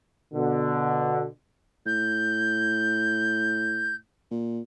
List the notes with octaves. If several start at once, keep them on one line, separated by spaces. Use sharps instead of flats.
B2 D3
A2 G6
A#2